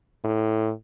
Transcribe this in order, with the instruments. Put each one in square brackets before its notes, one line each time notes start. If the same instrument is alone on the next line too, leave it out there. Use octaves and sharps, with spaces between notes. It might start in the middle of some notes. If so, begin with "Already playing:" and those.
[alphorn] A2